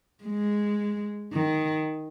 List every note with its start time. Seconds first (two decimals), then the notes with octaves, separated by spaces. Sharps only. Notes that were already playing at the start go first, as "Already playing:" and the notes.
0.24 G#3
1.33 D#3